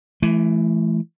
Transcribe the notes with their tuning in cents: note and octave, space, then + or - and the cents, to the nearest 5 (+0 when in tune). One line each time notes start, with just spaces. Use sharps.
E3 +15 A3 -30